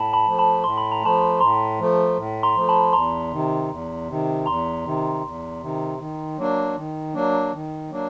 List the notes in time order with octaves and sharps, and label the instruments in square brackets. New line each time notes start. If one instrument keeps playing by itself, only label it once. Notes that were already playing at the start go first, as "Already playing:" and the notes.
Already playing: [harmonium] A2 [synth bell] A5 B5
[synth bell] A5 B5
[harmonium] F3 A3
[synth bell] A5 B5
[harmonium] A2 [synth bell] C6
[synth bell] B5
A#5
[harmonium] F3 A3 [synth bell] A5 B5
[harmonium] A2 [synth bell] A#5 C6
[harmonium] F3 A3
A2
[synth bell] A#5 C6
[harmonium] F3 A3
[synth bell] A5 B5
[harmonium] E2 [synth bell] A#5 C6
[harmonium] C3 D#3
E2
C3 D#3
[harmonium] E2 [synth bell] A#5 C6
[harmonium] C3 D#3
E2
C3 D#3
D#3
F#3 A#3 D4
D#3
F#3 A#3 D4
D#3
F#3 A#3 D4